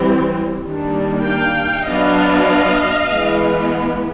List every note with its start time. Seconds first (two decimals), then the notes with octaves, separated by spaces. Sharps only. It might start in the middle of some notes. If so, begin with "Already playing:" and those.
Already playing: E3 G3 C4
0.63 D#3 G3 A#3 D4
1.24 F5 G5
1.86 F#3 B3 D4 D#5 F5
3.08 E3 G#3 B3